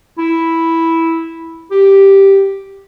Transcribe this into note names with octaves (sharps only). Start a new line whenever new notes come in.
E4
G4